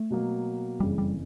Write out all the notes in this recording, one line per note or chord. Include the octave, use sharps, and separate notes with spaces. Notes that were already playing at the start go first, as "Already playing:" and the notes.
Already playing: A3
B2 F#3 A#3
F#1 F2 C#3 E3 G3
G3